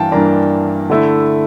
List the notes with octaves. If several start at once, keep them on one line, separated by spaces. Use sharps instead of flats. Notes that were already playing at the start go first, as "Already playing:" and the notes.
Already playing: G2 E3 A#3 D4 F5 G5 A5
G2 E3 A#3 D4 A#5
D3 A3 E4